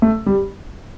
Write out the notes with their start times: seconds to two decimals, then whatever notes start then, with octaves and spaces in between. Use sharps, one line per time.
0.02 A3
0.26 G3